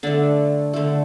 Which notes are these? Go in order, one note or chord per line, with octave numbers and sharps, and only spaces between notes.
D3 A3 D4
D3 A3